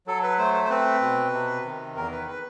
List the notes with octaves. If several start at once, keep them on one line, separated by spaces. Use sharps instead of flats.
F#3 A4
B4
A3 C5
C5
C5
C4 B4
B2
C3
D#3
E2 A#4
B4
B4